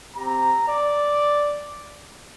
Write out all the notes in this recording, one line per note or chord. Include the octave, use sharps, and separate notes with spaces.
C4 G4 A#5
D5